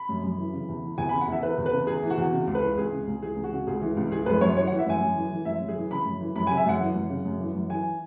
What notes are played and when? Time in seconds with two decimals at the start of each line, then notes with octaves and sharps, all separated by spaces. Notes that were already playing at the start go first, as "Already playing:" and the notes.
Already playing: B5
0.09 F#2
0.23 F#2
0.38 E3
0.53 C#3
0.69 E2
0.83 E3
0.98 E2 G#5
1.09 C#3 B5
1.21 F#5
1.28 E2 E5
1.43 E3 B4
1.58 E2
1.66 B4
1.72 C#3
1.87 E2 G#4
2.03 E3
2.10 F#4
2.17 E2
2.32 C#3
2.47 C#2
2.55 B4
2.62 E3
2.77 C#2 G#4
2.92 C#3
3.07 C#2
3.22 E3 G#4
3.36 C#2
3.44 F#4
3.52 C#3
3.67 C#2 G#4
3.81 E3
3.97 C#2
4.12 E3 G#4
4.26 F#2 B4
4.41 F#2 C#5
4.56 E3 C#5
4.67 E3 F#5
4.79 E5
4.86 F#2 G#5
5.01 F#2
5.16 E3
5.31 E3
5.45 F#2 E5
5.60 F#2
5.68 G#4
5.76 E3
5.91 C#3 B5
6.05 F#2
6.20 E3
6.36 F#2 B5
6.47 C#3 G#5
6.57 E5
6.66 F#2 F#5
6.80 E3
6.95 F#2
7.10 C#3
7.25 F#2
7.40 E3
7.54 F#2
7.70 E3 G#5